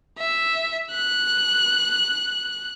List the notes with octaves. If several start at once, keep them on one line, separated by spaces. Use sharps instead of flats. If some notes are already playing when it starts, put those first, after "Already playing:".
E5
F#6